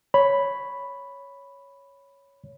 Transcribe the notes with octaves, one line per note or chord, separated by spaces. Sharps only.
C#5 B5